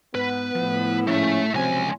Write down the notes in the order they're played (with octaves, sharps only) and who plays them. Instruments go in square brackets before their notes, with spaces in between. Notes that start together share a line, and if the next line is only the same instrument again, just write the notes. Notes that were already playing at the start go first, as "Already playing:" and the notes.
[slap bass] G#2 [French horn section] B3 [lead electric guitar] B4
[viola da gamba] A2 E4 [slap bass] F3
[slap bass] G#2 F3 [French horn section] C#3 C#4 [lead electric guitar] A3 E5
[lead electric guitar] C#2 G#5 [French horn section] F#2 F#3 C4 [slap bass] C3 F3